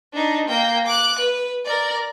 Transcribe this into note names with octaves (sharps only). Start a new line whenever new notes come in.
D4 D#4
A#3 G5
D6 F#6
B4
A#4 D5